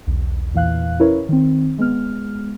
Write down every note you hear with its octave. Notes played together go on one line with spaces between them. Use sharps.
B1 E2
E2 A#2 E3 F5 F#6
C#4 E4 A#4 B4 C#5
D#3 C4
G#3 B3 F6